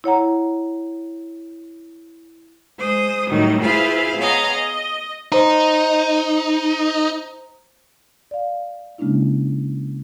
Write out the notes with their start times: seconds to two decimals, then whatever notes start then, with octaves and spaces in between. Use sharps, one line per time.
0.04 E4 C#5 F#5 A#5
2.78 G#3 C5 D#6
3.28 A2 D#3 F#3 G3 D#4
3.61 E4 F4 G#4 B4 C5 F5
4.17 B3 G#4 C#5 D#5 F5 A#5
4.50 D#5
5.32 D#4 C5 A#5
8.31 D5 F5
8.98 C#3 G#3 A#3 C#4 D4 E4